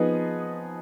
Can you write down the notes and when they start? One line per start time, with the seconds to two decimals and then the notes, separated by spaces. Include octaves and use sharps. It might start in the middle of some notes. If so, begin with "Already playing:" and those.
Already playing: F3 B3 D#4 G#4 B4